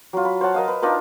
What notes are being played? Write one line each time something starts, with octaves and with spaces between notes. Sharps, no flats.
F#3 F4
B5
C5 C#5 F#5 A5
A#4 D#5 F5
B4
D4 D#4 F4 A#4